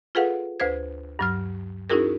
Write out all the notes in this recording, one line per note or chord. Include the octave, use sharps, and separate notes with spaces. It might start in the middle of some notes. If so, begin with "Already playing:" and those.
F4 G#4 A4 B4 F5 F#5
D2 B4 C5 G#6
G2 F#3 F6
C#4 D#4 E4 F#4 G#4 A#4